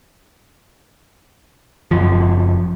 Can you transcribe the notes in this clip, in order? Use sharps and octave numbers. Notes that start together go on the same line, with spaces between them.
F#1 F#2 F3